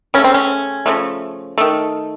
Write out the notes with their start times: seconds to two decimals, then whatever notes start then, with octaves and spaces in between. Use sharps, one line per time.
0.14 C#3 A3 C#4
0.24 C4
0.34 C#4
0.86 C#3 F3 A3
1.58 D#3 A3